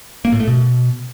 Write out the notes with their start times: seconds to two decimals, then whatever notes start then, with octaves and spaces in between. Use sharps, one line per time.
0.25 A#3
0.32 A2
0.40 A3
0.48 B2